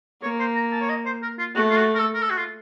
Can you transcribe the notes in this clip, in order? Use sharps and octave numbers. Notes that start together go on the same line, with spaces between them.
A#3 C#5
C5
A#5
A5
C#5
D#5
C5
A#4
F4
A3 F#4
F4
F#4
A#4
A4
A#4
A4
F#4
F4